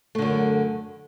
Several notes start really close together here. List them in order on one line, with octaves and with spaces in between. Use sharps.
A3 D3 F#2